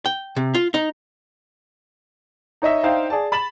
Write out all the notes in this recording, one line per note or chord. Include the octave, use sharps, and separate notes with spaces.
G5
C3
F4
D#4
D#4 C#5 D#5 E5
D4 D#4 C5 E5 F5 G5
G#4 D5 A5
B5 A6 E7 F#7